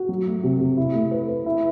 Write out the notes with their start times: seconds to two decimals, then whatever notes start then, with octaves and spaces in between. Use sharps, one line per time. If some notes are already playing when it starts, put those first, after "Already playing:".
Already playing: F#4
0.09 F#3
0.27 A3
0.44 C3
0.61 C3
0.77 E4
0.94 A3
1.11 B4
1.28 B4
1.46 E4